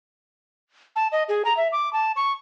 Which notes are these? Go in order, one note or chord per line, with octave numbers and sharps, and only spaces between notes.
A5
D#5
G#4
A#5
E5
D6
A5
C#6